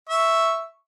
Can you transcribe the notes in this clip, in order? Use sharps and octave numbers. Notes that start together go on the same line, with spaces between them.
E5 C#6